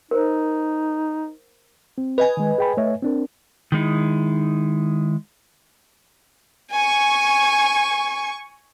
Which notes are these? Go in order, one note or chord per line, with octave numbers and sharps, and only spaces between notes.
D#4 A#4 C5
C4
B4 D#5 G#5
D#3 G#3
G#4 G5 B5
A3 C#5 E5
C4 D4 A#4
D#3 G#3 D#4 E4
G#5 C#6